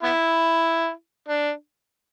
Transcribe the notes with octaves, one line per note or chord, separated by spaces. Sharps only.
B3 E4
D4